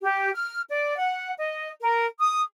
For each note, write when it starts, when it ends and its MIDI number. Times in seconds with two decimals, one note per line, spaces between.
0.03 0.33 67
0.34 0.62 89
0.68 0.97 74
0.97 1.32 78
1.38 1.69 75
1.80 2.06 70
2.20 2.41 87